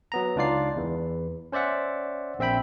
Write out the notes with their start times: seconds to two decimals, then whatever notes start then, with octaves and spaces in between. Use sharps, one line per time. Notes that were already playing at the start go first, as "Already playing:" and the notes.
0.12 F#3 B3 A#5
0.36 C#2 D4 D#4 F4 D5 C7
0.77 E2 E3
1.52 C#4 C5 D5 E5 F#5
2.39 A#1 C4 E5 G5 B5